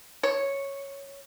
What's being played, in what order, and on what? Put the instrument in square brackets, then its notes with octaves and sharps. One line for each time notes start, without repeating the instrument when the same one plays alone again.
[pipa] C#5